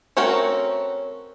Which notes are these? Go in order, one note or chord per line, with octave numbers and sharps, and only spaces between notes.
A3 C4 C#4 F#4 A#4